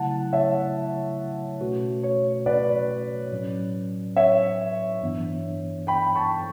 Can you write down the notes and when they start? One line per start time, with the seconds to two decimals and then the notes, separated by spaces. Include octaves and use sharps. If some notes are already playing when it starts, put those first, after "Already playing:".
Already playing: C#3 F#3 A3 E4 F#5 A5
0.33 C#5 E5
1.61 B2 A3 C#4 F#4 B4
2.03 C#5
2.46 B4 D5
3.31 A2 F#3 C#4
4.16 C#5 E5
5.02 G2 E3 B3 D4
5.87 G5 B5
6.15 A5 C#6